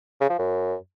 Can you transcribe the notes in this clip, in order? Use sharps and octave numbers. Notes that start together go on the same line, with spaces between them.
C#3
F3
F#2